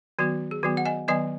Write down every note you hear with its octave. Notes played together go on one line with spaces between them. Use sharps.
D#3 F#3 B3 F#4
G#4
D#3 F#3 B3 F#4
F#5
D#5 G#5
D#3 F#3 B3 D#5 G#5